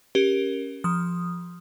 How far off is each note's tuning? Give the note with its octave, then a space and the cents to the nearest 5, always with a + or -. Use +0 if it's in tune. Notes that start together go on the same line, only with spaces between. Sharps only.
C#4 +0 G4 +0 A#4 +10
F3 +0 D#6 -5